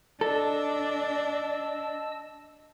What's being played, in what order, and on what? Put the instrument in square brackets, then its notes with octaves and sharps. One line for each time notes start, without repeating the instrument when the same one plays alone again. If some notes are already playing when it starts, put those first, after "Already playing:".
[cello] D4 [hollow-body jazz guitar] A4 [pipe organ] D#5 A5 E6